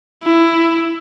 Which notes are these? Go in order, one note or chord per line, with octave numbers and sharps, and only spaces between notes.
E4